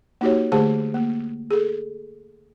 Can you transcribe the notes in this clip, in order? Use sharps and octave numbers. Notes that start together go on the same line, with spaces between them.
A#3 D#4 F#4 G4 C#5
D3 A3 G4 G#4 C5 A5
A#3
G#4 A4